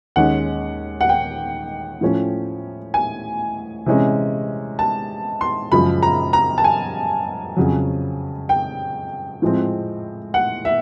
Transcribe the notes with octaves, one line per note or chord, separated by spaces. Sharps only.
D#2 D#3 G#3 C#4 F#5
F#5
G5
A2 F3 A3 C#4
G#5
C3 E3 G#3 C#4
A5
C6
F#2 C#3 F3 G#3 B5
A#5
A#5
A5
G#5
F2 C#3 F#3
G5
A2 F3 G#3 C4
F#5
E5